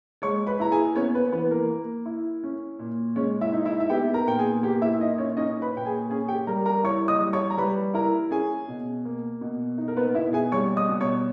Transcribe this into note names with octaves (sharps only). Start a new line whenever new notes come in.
G#3 C#5 C#6
B4 B5
E4 A#5
G#4 G#5
B3 C#4 C#5
B3 B4
E3 B3 B4
A#3 A#4
A#3
E4
C#4
A#2
G#3 C#4 C#5
E4 E5
D#4
E4 E5
E5
B3 G4 G5
A#4 A#5
A#2 G5
G#4 G#5
A#3 G4 G5
E4 E5
A#2 D#4 D#5
C#4 C#5
C#4 D#4 D#5
B4 B5
A#2 G5
G#4 G#5
C#4 G#4 G#5
G4 G5
G3 A#4 A#5
A#4 A#5
E4 C#5 C#6
D#5 D#6
G3
C#5 C#6
A#5
G3 B4 B5
E4 A#4 A#5
C#4 G#4 G#5
B2
A#3
B2
D#4
A#4
B3 B4
B2 E4 E5
G#4 G#5
G3 C#5 C#6
D#5 D#6
B2
C#5 C#6